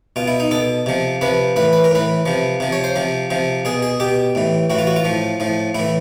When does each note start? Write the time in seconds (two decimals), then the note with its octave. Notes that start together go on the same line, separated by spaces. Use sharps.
0.16 B2 F4
0.27 E4
0.40 D#4
0.51 B2 A4
0.86 C3 F3
1.21 C3 F3 B4
1.56 A2 E3 B4
1.73 B4
1.84 A#4
1.91 A2 E3 B4
2.26 C3 F3
2.60 C3 F3
2.72 C#5
2.84 C5
2.96 C3 F3
3.30 C3 F3
3.65 B2 G#4
3.82 G#4
4.00 B2 G4
4.35 A2 E3
4.70 A2 E3 F#4
4.78 F4
4.87 F#4
4.96 F4
5.04 A2 F3
5.40 A2 F3
5.75 A2 E3 E4